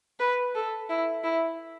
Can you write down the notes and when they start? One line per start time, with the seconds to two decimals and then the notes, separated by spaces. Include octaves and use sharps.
0.19 B4
0.55 A4
0.89 E4
1.23 E4